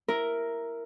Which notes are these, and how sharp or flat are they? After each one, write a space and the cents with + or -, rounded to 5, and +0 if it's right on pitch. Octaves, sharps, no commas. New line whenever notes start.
E4 +0 A#4 +0